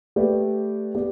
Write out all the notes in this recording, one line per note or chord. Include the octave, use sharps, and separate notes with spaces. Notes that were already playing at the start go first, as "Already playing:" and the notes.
A3 G4 B4 D5
B3 G4 D5